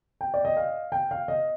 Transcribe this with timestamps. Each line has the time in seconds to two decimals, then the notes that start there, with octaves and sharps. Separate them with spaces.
0.21 G5
0.34 D5
0.45 D#5
0.57 F5
0.92 G5
1.11 F5
1.28 D#5